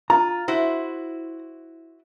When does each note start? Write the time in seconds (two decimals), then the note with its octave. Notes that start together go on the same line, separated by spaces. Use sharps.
0.10 F4 A#5
0.48 E4 F#4 C5